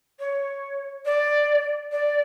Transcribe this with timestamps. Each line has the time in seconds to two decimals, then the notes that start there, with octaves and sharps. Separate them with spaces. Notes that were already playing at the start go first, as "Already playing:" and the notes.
0.19 C#5
1.05 D5
1.92 D5